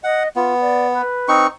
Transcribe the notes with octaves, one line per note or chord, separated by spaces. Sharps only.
D#5 F#5
B3 F4
D5
B4
C4 D#4 C#6